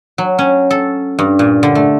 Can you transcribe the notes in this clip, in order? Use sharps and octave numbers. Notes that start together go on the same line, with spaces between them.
F#3
C#4
A4
G2
A#2
D3
A3